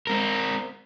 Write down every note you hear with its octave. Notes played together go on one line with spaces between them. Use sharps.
C4 A#4